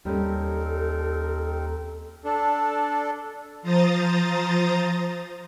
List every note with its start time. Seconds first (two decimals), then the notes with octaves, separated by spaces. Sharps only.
0.05 D#2 G3 C4 C#4 D#4 A4 A#4
2.25 D4 A4
3.62 F3 C5 A#5 D#6 A6